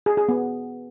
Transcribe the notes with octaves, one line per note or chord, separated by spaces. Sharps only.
G#4
G#4
B3